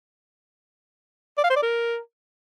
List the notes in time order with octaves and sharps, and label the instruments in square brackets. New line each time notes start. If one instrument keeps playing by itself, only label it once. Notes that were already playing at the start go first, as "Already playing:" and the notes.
[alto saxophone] D5
F5
C5
D5
A#4